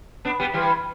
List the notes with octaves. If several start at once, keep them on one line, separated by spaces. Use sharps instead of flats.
B3 D4
G3 B3
E3 G3